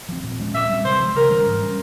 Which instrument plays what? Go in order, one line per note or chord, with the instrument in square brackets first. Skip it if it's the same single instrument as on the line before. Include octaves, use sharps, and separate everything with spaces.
[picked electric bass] F3 C4
A#2
F3 G#3 C#4
[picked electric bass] A#2 [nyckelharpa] E5
[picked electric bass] G3 C4
[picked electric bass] C3 [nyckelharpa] C5
[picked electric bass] F3 G#3
[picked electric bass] C#3 [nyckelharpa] A#4
[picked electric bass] E3 G3 C#4
G#2
G3 C#4